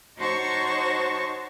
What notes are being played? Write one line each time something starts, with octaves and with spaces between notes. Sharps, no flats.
D#4 F#4 C5 C#5 A5 C#6